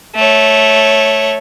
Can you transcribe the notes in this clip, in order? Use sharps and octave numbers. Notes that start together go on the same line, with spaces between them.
A3 C#5